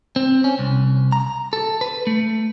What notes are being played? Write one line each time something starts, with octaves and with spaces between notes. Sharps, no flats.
C4
C#4
C2
A#5
A4
B4
A3